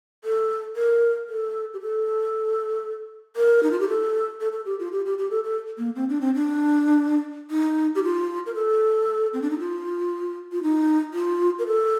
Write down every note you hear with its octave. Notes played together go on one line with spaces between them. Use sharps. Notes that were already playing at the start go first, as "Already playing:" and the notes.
A4
A#4
A4
G4
A4
A#4
D#4
F4
G4
A4
A4
A4
G4
F4
G4
G4
G4
A4
A4
A#3
C4
D4
C4
D4
D#4
G4
F4
A#4
A4
C4
D4
D#4
F4
F4
D#4
F4
A#4
A4